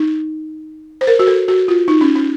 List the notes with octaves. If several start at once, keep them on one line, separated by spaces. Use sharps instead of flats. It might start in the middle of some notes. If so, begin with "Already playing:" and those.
Already playing: D#4
C5
A#4
F#4
A4
F#4
F4
D#4
C#4
C#4